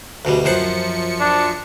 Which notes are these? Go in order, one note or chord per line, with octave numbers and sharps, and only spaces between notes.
D2 B2 G3
F#2 F3 C5 F#5 C#7
D4